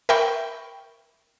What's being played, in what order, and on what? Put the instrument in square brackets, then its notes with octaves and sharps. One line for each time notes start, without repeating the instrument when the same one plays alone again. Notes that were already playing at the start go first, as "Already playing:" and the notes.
[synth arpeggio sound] A#4 E5 G5 B5 C#6